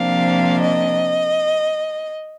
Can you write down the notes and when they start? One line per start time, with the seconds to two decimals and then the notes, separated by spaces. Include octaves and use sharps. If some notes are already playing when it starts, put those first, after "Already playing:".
Already playing: C3 F3 A#3 D4 F5
0.61 D#5